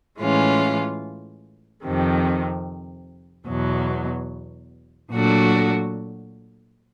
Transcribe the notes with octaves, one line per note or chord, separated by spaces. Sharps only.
A2 E3 G#3 C#4 F4
F2 C3 D#3
E2 B2 F#3
A#2 F#3 A3 D4 F#4